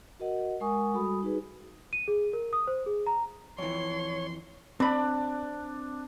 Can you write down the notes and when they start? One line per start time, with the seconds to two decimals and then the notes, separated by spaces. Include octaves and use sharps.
0.20 F#4 A#4 D#5 F#5
0.60 G#3 A#4 F#5 G#5 C#6 D#6
0.94 G3 F#4 A4 B5 D#6
1.23 D#4 F#4 G#4 B4
1.93 D#7
2.08 G#4
2.33 A#4
2.53 D#6
2.67 C5
2.86 G#4
3.07 A#5
3.58 F2 E3 C#5 C6
4.80 C4 D4 B5